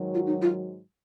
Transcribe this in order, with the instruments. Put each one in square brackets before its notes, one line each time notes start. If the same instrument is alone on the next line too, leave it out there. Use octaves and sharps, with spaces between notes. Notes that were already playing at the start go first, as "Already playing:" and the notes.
Already playing: [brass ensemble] G#2 D#3 F#3
[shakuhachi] F4
D#4
F4